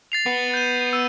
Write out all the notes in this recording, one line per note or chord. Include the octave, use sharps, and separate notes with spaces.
A6 C7 F7
B3
G6 D#7
E6